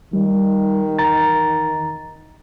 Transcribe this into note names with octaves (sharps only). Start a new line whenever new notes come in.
D#3 G3
E2 A#5 A6